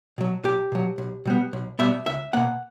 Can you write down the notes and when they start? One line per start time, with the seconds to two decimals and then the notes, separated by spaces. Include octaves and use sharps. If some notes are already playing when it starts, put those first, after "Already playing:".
0.18 B2 F#3
0.44 B1 G4
0.72 B2 F#3
0.98 B1
1.25 B2 G3 B3
1.53 B1
1.79 B2 G3 B3 E5
2.06 C#2 E5
2.33 B2 A#3 F#5